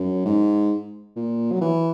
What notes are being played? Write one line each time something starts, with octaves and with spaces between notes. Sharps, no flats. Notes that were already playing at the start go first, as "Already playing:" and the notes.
Already playing: F#2
G#2
A#2
F#3
E3